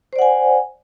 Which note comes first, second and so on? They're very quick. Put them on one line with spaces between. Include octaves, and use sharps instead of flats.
C5 D5 F#5 G#5